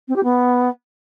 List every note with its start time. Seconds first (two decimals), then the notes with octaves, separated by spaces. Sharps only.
0.08 C4
0.16 G4
0.24 B3